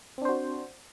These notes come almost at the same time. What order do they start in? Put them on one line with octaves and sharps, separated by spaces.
C4 D4 C5 F#4